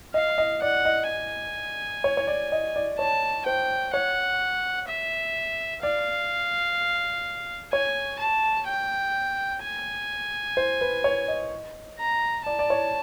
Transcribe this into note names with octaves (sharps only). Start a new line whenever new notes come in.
D#5 F5
D#5
D5 F#5
D#5
G#5
C#5
C#5
D5
D#5
D5
C#5 A5
C5 G5
C#5 F#5
E5
D5 F5
C#5 G#5
A5
G5
G#5
C5
B4
C#5
D#5
A#5
D5 A5
D5
C#5